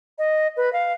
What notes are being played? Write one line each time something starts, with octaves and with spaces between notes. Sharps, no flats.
D#5
B4
F5